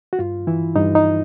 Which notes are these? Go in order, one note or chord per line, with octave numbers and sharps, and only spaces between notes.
F#4
G2 F4
E3 E4
G2 D#4
D#4